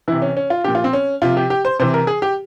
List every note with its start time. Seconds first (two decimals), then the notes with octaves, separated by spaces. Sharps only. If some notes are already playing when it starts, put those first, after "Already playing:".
0.08 C3 E3 E4
0.22 C#4
0.37 C#4
0.50 F4
0.64 A#2 F3 G4
0.75 F4
0.84 C4
0.93 C#4
1.22 C3 F3 F4
1.37 G4
1.50 G4
1.65 C5
1.79 C3 E3 C5
1.94 A#4
2.07 G#4
2.22 G4